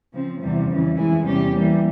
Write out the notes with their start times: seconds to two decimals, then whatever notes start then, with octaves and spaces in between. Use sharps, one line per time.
0.12 C#3 F3 C4
0.40 E2 C3 E3 G3
0.68 F2 C#3 E3
0.97 F2 E3 G#3 E4 G#4
1.24 E2 C3 G3 C#4 G4
1.53 E3 G3 A#3